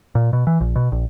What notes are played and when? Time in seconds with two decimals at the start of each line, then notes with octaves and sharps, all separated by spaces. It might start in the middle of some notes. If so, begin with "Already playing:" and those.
0.15 A#2
0.33 B2
0.47 E3
0.61 A#1
0.76 B2
0.92 A#1